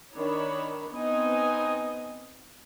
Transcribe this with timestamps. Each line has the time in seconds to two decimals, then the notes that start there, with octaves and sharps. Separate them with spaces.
0.15 D#3 D4 C#5 B5
0.94 B3 C4 D#4 D#5 G#5